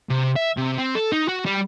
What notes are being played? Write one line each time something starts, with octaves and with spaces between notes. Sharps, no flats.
C3
E5
C3
C4
A4
D#4
F#4
G3